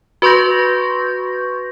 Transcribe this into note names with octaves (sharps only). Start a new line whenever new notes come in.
F#4 B4 C6 C#6 G6 A#6